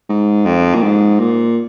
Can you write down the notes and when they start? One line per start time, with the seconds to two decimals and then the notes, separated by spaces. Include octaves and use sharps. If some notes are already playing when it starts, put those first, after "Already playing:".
0.09 G#2
0.45 F2
0.74 A#2
0.83 G#2
1.19 A#2